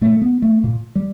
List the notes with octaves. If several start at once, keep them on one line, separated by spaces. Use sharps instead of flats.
A#2 A3
B3
A3
A#2
G3